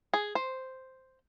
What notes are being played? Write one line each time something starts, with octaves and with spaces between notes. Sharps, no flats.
G#4
C5